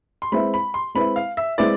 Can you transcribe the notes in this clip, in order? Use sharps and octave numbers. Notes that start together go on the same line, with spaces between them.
C6
G#3 C4 E4 B4 E5 B5
B5
C6
G#3 C4 E4 B4 E5 B5
F5
E5
G#3 C4 E4 B4 D5 E5